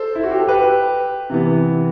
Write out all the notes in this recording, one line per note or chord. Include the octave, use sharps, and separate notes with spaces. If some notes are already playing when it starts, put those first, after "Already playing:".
Already playing: A4 C5
E4
F#4
G4
A4
G4 B4
C3 E3 B3